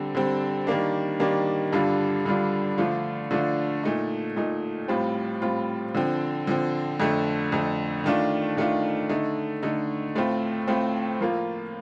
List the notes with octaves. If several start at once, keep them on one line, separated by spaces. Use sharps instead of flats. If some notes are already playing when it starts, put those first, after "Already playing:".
Already playing: D3 G3 C4
D3 G3 C4
D#3 G3 A#3 D4
D#3 G3 A#3 D4
G2 D3 G3 D4 F4
G2 D3 G3 D4 F4
D3 F3 A3 D4 F4
D3 F3 A3 D4 F4
A#2 A3 D#4
A#2 A3 D#4
A2 G3 C4 F4
A2 G3 C4 F4
D3 F3 C4
D3 F3 C4
F2 D3 A3
F2 D3 A3
D#3 A3 D4 F4
D#3 A3 D4 F4
D3 A3 D#4
D3 A3 D#4
A2 A3 C4 F4
A2 A3 C4 F4
A2 F3 A#3 F4